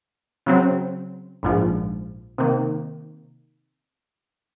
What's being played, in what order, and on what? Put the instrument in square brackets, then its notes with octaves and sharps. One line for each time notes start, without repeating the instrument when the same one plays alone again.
[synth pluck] C#3 F#3 C4
A#1 G#2 F3
C3 D#3 A#3